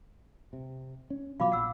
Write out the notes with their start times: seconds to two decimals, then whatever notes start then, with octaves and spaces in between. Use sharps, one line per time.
0.53 C3
1.10 C#4
1.40 B2 F3 F#3 F5 B5 D6
1.52 A#1 F#5 E6